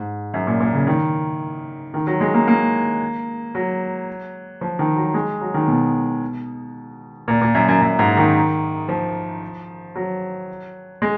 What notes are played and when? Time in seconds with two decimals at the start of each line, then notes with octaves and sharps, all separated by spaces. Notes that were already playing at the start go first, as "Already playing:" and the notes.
Already playing: G#2
0.34 F#2
0.47 A#2
0.60 A#2
0.74 C#3
0.87 D#3
1.94 D#3
2.07 F#3
2.21 G#3
2.34 A#3
2.48 A#3
3.55 F#3
4.61 F3
4.79 D#3
4.96 F#3
5.14 G#3
5.41 F#3
5.54 D#3
5.68 B2
7.28 A#2
7.41 A#2
7.54 F#2
7.68 F#2
7.82 F#2
7.99 G#2
8.17 D#3
8.89 F3
9.96 F#3
11.02 G#3